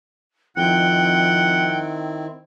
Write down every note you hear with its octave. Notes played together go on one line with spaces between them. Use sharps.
F2 D#3 C4 E4 F#5 G5